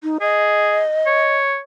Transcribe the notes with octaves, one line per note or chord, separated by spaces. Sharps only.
D#4
G#4 D#5
C#5